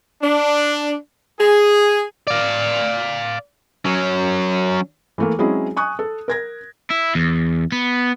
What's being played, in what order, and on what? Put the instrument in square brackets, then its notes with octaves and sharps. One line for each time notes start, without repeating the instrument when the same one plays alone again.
[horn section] D4
G#4
[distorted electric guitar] D5 F5
F#3 C#4
[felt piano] E3 A3 A#3
F#3 G#3 C4 C#4 E4 G#4
G#5 C#6 D#6 F#6
A4
A#4 G#6 A#6
[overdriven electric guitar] E4
E2
B3